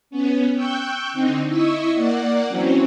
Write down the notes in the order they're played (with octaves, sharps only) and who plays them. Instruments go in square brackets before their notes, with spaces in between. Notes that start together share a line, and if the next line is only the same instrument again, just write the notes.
[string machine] B3 C#4
G5 C#6 E6 F#6 G6
D3 C4 D#4
E4 D#5 C#6 E6
A#3 D5 F#5
E3 F#3 C4 C#4